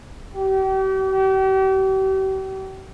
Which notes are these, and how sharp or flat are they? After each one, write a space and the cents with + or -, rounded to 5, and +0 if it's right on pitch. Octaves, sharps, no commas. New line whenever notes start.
G4 -40